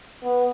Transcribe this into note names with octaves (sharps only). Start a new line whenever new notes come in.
B3